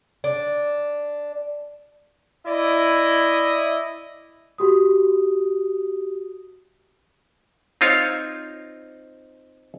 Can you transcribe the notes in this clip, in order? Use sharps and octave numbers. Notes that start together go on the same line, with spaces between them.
D4
E4 D5 D#5
F#4 G4 D#6
C4 D#4 F4 C5 C#5